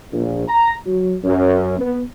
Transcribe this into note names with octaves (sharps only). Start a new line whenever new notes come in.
A#1
A#5
F#3
F#2
B3